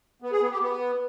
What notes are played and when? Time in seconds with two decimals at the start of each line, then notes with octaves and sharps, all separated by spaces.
0.22 B3
0.32 G#4
0.42 B3
0.51 G4
0.61 B3